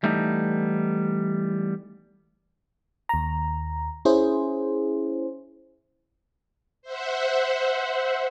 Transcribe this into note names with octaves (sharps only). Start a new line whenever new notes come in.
E3 G3 A3 B3 D#4
D#2 A#5
C#4 E4 G#4 C5
C5 E5 F#5